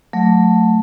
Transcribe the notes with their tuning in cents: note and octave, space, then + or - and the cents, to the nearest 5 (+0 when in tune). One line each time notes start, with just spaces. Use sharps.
F#3 -25 A3 +5